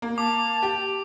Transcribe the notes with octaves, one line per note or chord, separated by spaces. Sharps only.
A#3
A5 D6
G4